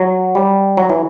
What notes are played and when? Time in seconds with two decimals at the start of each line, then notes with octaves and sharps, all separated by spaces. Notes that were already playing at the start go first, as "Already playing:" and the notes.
Already playing: F#3
0.35 G3
0.77 F#3
0.89 E3